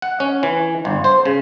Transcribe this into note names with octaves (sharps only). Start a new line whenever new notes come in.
F#5
C#4
E3
G1
C5
C#3